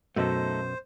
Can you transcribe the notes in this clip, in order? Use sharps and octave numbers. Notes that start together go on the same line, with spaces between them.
F#2 B2 A3 D#4 A4 C5